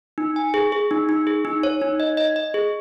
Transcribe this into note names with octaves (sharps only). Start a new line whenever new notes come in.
D#4
G#5
G#4
G#4
D#4
D#4
G#4
D#4
C#5
D#4
D#5
D#5
D#5
G#4